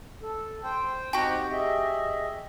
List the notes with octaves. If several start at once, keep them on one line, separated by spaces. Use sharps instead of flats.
A4
C5 G5
C4 D#4 F#4 G4
G#4 D#5 E5